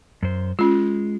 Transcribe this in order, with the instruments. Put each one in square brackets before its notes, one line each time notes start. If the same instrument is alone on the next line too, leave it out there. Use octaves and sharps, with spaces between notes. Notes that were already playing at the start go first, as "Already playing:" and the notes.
[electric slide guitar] F#2 C5
[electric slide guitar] G#3 [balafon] C#4 F4